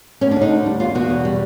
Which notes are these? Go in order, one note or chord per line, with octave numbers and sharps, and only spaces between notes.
D2 C#4
D4
D3
D#4
D2
G3
E2 F4
B2 F#4
E2
G3